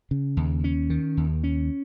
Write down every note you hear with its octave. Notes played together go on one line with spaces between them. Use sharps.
C#3
D#2
C#4
D#3
D#2
C#4